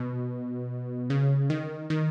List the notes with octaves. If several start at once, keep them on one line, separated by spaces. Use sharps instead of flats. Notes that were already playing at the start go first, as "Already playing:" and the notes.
Already playing: B2
C#3
D#3
D#3